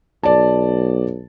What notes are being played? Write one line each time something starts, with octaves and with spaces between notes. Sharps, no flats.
B1 D5 A5